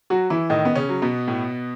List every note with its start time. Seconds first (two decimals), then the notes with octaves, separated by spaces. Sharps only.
0.10 F#3 F#4
0.30 E3 E4
0.50 A2 D#3 D#4
0.65 B3
0.75 C#3 C#4
0.89 F#3
1.02 B2 B3
1.28 A2